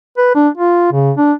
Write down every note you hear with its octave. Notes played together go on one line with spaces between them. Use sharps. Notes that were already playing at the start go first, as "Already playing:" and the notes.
B4
D4
F4
C#3
D4